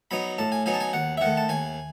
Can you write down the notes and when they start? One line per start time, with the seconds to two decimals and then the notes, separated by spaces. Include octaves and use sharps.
0.11 F#3 B3 D#4 B5
0.38 A2 A5
0.52 G#5
0.66 F#3 B3 D#4 G#5
0.74 A5
0.80 G#5
0.93 D#2 F#5
1.17 E5
1.21 D#3 A3 F#5
1.37 A5
1.49 D#2 G#5